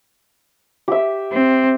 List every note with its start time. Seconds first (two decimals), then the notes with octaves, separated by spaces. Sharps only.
0.88 G4 E5
1.32 C4